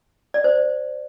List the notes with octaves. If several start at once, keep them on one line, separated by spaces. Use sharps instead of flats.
D5
C5